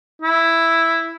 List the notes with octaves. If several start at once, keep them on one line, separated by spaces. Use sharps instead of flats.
E4